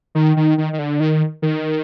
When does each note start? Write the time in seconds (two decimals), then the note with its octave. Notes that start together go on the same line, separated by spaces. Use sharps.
0.15 D#3
0.37 D#3
0.58 D#3
0.73 D#3
0.79 D3
1.00 D#3
1.42 D#3